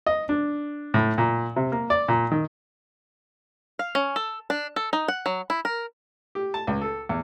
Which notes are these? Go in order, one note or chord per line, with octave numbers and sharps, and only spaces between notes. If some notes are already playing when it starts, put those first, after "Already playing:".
D#5
D4
A2
A#2
C3
A#3
D5
A#2
D#3
F5
C#4
A4
D4
A4
D#4
F#5
F#3
E4
A#4
G4
A5
C#2
A4
E2